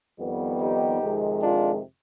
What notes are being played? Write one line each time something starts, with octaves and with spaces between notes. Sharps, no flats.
F2 D#3 G3 B3
D#4 G4
F2 C3 D#3 G#3
D4 F4